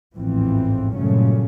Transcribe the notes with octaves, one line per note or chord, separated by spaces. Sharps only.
A1 E2 G#2 E3 F3 C4
G2 A#2 C#3 F#3 A3 C#4